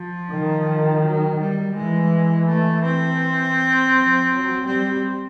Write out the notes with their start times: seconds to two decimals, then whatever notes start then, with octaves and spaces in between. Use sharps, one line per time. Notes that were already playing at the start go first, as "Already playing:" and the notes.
Already playing: F3
0.31 D#3
1.04 F#3
1.40 G3
1.76 E3 G#3
2.49 A3
2.85 C4
3.95 F3
4.31 F#3
4.67 G3 C4